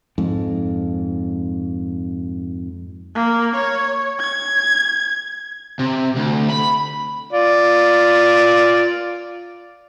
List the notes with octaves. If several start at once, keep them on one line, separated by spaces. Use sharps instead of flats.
F2 G#2
A#3
C#5
G#6
C3
D2
B5
F4 D5